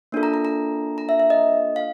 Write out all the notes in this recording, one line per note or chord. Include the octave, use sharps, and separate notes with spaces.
A#3 D4 F4 A4
A#5
A#5
A#5
A#5
E5
E5
D#5
F5